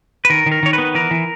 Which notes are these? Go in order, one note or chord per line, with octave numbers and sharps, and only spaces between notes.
B4
D#3 A#4
D#3
A#4
D#3 C#5
B4
B3
E3 A#4
E3